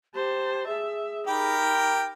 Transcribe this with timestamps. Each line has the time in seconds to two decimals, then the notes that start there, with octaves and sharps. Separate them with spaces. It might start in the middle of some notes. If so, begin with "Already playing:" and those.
0.15 G4 C5 A5
0.68 G#4 E5
1.27 D#4 G4 A#4 G5 B5